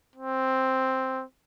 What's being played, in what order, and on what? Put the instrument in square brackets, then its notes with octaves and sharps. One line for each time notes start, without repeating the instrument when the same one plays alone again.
[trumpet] C4